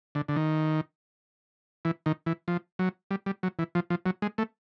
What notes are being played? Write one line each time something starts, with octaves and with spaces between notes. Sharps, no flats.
D3
D3
D#3
E3
D#3
E3
F3
F#3
G3
G3
F#3
E3
F3
F3
F#3
G#3
A3